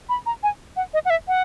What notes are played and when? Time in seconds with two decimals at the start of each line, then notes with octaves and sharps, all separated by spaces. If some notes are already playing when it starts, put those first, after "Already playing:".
0.09 B5
0.26 A#5
0.43 G#5
0.76 F#5
0.94 D#5
1.05 F#5
1.10 E5
1.28 F#5